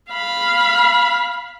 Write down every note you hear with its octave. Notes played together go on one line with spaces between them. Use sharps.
F5 B5